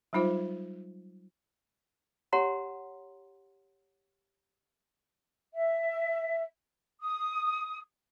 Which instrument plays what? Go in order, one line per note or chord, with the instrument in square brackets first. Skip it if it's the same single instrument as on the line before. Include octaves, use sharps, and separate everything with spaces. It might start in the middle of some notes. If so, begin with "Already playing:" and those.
[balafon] F#3 G3 D#4 F4 C5
[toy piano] G4 C#5 F#5 A#5 C6
[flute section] E5
D#6